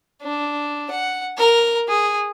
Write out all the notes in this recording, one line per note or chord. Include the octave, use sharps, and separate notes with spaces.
D4
F#5
A#4
G#4